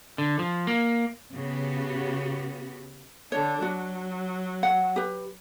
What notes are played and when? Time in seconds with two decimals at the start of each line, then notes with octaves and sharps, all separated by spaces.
0.18 D3
0.39 F3
0.67 A#3
1.33 C#3 B3 F#4 G4
3.32 D3 D4 C#5
3.62 F#3 F#4
4.63 F#5
4.96 G4 B4